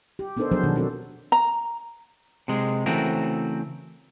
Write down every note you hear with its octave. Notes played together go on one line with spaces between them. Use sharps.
G4
B3 D4 D#4 A4 A#4 C5
F3 F#3 B3 D4 G#4 C5
B2 D#3 D4
C4 D4 F#4 A4
A#5
C3 G#3
C#3 E3 A3 C4 F#4 A#4